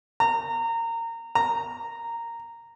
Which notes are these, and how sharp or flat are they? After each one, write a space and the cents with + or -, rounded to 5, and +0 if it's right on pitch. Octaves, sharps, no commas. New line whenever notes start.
A#5 -25
A#5 -10